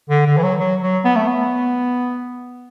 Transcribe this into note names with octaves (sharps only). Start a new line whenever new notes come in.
D3
D3
E3
F#3
F#3
F#3
B3
A3
B3